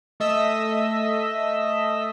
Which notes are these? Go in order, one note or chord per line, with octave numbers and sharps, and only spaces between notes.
A3 A4 D#5 E5 E6 B6